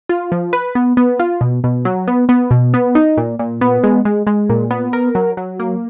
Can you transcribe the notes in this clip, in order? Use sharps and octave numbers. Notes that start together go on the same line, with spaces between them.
F4
F3
B4
B3
B3
F4
B2
B2
F#3
B3
B3
B2
B3
D#4
A#2
A#2
B3
G#3
G#3
G#3
A#2
B3
A#4
F#3
F#3
A#3